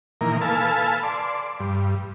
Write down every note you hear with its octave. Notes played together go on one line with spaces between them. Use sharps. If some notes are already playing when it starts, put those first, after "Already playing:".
A#2 D#3 E3 A#3 A#4
A4 B4 F5 G#5 A5 E6
D5 C6
G2